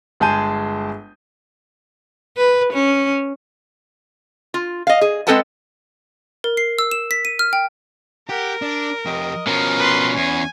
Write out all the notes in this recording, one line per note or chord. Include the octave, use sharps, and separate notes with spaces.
G1 G#3 G#4 A5 G6 D#7
B4
C#4
F4
D#5 F5
G#4
G#3 C4 A4 B4 F#5 A5
A#4
C7
E6
E7
B6
D#7
F6
G5
G4 A#4 F#5
D4 D5
F2 G4 D#5
B2 F3 C#4 A#4
B4 C6
E2 G#5